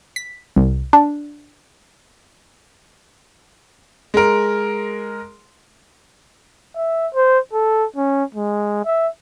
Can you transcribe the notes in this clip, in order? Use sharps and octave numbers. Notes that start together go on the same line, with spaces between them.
B6
C2
D4
G#3 A#4
E5
C5
A4
C#4
G#3
E5